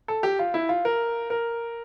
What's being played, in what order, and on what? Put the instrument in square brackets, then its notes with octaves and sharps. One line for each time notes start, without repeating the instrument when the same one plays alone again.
[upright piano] A4
G4
F4
E4
F4
A#4
A#4